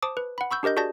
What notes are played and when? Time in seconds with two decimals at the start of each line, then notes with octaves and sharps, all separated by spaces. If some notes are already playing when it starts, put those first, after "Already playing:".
0.02 C5 A5 D6 D#6
0.17 B4
0.38 F#5 B5
0.51 B5 C#6 E6 G6
0.63 D4 G4 A#4 D#5 G6
0.77 F#4 G#4 D5 A5 G6 A#6